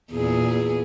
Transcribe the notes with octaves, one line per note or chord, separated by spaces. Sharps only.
E2 A#2 G#4